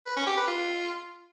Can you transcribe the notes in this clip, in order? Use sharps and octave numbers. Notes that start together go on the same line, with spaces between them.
B4
C#4
G4
B4
F4